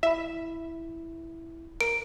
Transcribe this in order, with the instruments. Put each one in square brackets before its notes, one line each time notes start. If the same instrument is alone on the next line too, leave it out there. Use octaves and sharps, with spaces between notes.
[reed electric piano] E4 B5 [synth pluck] E5
[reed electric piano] A#4 [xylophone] D7